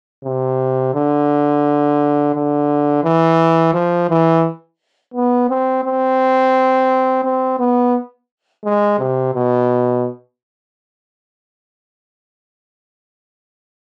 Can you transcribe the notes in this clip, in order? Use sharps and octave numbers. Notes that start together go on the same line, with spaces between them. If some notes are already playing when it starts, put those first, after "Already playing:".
C3
D3
D3
E3
F3
E3
B3
C4
C4
C4
B3
G#3
C3
B2